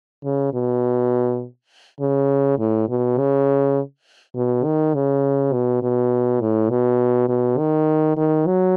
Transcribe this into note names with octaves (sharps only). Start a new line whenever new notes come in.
C#3
B2
C#3
A2
B2
C#3
B2
D#3
C#3
B2
B2
A2
B2
B2
D#3
D#3
F#3